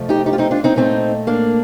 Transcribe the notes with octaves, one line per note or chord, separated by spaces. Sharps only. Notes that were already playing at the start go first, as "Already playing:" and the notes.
Already playing: F2 C3 F3 A3
D#4 G4
D#4 G4
F4
C4 D#4
D4 F4
C4 D#4
A#2 A3 C4 D#4
A#3 D4